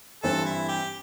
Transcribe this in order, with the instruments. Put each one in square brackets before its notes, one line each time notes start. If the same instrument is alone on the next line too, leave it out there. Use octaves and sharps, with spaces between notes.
[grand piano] G2 E3 C4 [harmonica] A4
[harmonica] E4
G4